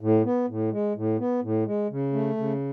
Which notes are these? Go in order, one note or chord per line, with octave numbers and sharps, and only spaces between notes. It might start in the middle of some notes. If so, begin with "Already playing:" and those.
A2
B3
A2
G#3
A2
B3
A2
G#3
C#3
A3
C#3